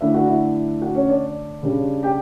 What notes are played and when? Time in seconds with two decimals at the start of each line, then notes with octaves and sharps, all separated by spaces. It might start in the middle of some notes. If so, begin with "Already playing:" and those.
0.01 D3 A3 D4 E4 E5
0.14 F#4 F#5
0.28 E4 E5
0.82 F#4 F#5
0.95 C#4 C#5
1.09 D4 D5
1.63 C#3 G3 D4
2.03 G4 G5